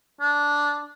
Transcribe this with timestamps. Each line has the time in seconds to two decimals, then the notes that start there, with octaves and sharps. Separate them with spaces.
0.21 D4